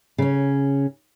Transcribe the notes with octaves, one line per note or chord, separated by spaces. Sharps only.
C#3 C#4